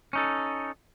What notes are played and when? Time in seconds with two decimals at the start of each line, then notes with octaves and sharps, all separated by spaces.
0.13 C#4 D#4 A4